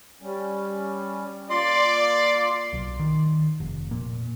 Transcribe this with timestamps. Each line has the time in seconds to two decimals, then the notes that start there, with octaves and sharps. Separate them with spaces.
0.21 G3 C#4
1.50 A#3 F4 D5 C6
2.73 B1
3.00 D#3
3.60 F1
3.91 A#2